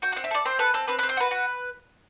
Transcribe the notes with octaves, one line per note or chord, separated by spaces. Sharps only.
F#4 G5
C4 F#5
E5
A4 D5
C4 C5
A4 B4
C4 A4
C4 B4
C4 B4
C5
F#4 B4
F#4